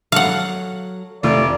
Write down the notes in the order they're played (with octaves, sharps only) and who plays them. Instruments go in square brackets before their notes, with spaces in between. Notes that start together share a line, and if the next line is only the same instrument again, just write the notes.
[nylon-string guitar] F#3 A4 [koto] F5 F#5
[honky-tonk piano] F1 [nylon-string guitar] A3 F4 [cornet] D5